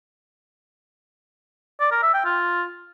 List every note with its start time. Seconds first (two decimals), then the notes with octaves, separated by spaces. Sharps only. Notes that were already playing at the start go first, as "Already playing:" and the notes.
1.80 D5
1.92 A#4
2.03 E5
2.14 G5
2.25 F4